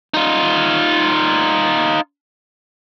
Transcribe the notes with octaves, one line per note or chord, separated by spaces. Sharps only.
D#4 F4